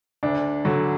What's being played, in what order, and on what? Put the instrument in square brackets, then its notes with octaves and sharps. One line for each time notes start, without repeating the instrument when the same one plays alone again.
[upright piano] D2 D4
D3 F#3